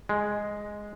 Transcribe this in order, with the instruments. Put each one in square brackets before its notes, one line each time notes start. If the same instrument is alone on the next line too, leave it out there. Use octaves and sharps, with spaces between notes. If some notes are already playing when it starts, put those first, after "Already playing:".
[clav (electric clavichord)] G#3